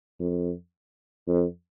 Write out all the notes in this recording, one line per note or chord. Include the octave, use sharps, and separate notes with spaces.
F2
F2